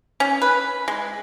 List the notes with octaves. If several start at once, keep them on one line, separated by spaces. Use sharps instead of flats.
C#4
B4
G#3